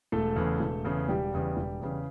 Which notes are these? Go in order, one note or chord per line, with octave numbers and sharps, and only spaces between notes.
E1 A3 A4
E2 C#3
E1
E2 C#3
E1 G3 G4
E2 C#3
E1
E2 C#3